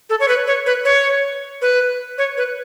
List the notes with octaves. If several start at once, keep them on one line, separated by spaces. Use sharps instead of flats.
A4
C#5
B4
C#5
B4
C#5
B4
C#5
B4